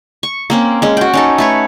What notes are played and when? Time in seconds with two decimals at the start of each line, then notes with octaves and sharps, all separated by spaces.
0.23 C#6
0.50 A#3 C4 C#4
0.82 G#3 C#4
0.97 F#4 G5
1.14 C#4 D#4 A4
1.38 A3 B4 C#5